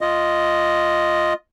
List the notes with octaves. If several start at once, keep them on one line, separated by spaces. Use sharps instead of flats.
F4 D#5